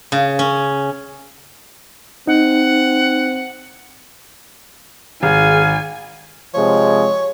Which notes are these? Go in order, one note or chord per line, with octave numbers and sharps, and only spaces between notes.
C#3
C#4
C4 D#4 F#5
G#1 G#4 F5 G#5
C3 F3 G#3 C#5